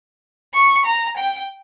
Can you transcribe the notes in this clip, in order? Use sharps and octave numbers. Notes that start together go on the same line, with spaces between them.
C#6
A#5
G5